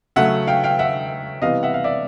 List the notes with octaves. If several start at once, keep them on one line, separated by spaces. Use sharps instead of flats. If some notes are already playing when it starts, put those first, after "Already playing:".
C#3 F#3 A3 C#4 E5 F#5
F5 G5
F5 G5
E5 F#5
C3 E3 G3 B3 D#5 F5
E5 F#5
F5
D5 E5